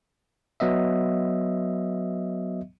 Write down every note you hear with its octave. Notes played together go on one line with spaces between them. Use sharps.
F#3 B3 D#5 E5